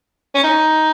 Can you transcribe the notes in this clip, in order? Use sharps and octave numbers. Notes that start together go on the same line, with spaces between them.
C#4
D#4